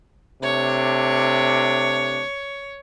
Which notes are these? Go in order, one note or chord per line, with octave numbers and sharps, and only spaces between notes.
C3 A3 D4 C#5